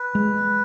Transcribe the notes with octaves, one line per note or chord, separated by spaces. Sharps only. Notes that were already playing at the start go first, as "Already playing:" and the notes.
Already playing: B4
G#3